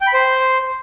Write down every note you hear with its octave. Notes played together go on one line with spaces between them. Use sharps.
G5
B5
C5